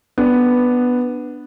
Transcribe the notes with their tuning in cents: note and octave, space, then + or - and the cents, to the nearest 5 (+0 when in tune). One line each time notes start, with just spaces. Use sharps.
B3 +0 D4 +10